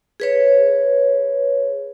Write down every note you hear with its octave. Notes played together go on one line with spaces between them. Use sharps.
G#4 B4 C#5